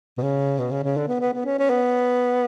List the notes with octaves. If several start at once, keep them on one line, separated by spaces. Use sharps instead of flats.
B2
C#3
B2
C#3
C#3
D3
B3
B3
B3
C#4
C#4
B3